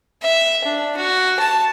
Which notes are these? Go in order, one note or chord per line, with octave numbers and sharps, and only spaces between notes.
E5
D4
F#4
A5